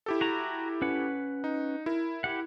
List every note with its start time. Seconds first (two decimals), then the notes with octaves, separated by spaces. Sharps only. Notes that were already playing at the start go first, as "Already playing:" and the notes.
0.06 E4 G4 A4
0.21 F#4 A#5
0.82 C#4 B4 F#5
1.44 D#4
1.86 E4 A#4
2.24 G4 F#5